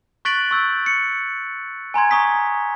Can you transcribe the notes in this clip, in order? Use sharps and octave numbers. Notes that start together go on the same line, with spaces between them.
C#6 F#6 A6 B6 D7 F#7
C#6 E6 G6
C#7
G#5 A#5 C6 G#6
A#5 C#6 D#6 B6